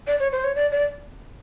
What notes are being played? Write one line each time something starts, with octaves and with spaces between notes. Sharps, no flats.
D5
C#5
C5
C#5
D5
D5